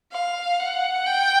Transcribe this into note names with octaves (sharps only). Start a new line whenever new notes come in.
F5
F#5
G5